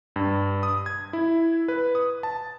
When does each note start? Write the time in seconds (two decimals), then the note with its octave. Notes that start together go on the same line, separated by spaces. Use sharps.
0.16 G2
0.63 D#6
0.86 G#6
1.13 E4
1.68 B4
1.95 D#6
2.23 A5